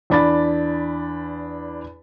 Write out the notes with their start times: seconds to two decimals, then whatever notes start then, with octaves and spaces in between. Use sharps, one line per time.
0.10 E2 D4 B5 A6